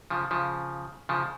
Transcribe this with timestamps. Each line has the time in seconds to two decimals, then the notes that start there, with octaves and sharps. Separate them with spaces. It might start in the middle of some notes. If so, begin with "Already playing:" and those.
0.10 C#3 F3
0.31 C#3 F3
1.09 C#3 F3